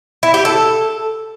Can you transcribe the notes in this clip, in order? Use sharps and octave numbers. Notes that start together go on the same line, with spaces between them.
E4
G4
A4